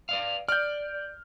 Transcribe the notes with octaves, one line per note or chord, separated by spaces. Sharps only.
B4 D5 F5
D5 F6 G6